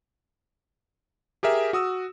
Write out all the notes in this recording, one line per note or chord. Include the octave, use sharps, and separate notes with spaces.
G4 G#4 A#4 E5
F#4 D#6 E6